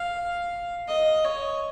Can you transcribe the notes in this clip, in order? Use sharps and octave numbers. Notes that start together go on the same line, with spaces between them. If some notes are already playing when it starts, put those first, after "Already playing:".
Already playing: F5
D#5
C#5